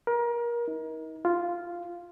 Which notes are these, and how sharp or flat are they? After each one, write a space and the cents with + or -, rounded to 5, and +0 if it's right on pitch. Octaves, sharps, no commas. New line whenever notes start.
A#4 +30
D#4 +40
F4 -5